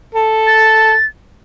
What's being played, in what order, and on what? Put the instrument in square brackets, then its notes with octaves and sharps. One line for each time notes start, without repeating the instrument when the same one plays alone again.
[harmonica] A4
[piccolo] A6